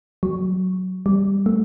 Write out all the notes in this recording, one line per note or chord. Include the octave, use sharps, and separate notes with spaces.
F#3
G3
A3